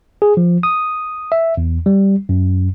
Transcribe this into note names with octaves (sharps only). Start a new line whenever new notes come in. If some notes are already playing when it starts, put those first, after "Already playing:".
G#4
F3
D#6
E5
E2
G3
F#2